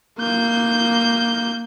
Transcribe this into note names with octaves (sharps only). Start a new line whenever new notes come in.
A#3 G6